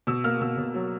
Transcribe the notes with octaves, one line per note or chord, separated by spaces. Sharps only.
B2 E6
A#3 F6
B2 E6
B2
F#3